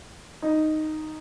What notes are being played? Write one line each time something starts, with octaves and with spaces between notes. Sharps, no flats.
D#4